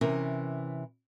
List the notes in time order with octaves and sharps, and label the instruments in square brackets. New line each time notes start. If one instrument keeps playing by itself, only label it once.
[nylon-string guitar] C3 E3 C#4 A#4